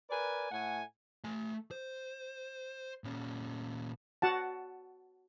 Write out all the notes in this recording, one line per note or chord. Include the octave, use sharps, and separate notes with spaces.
A#4 B4 D5 G#5
A2 A3 F#5 G#5
A3 G#5
C5
A#2 C#4
F#4 F#5 A5